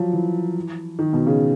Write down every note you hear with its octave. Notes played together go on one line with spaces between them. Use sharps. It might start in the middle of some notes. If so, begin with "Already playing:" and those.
Already playing: F3 F#3
E3
D#3
B2
C#3